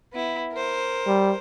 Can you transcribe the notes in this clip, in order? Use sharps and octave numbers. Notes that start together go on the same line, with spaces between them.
B3 E4
A#4 C5
G3